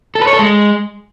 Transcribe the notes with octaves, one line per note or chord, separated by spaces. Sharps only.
A4
B4
C#5
A4
G#3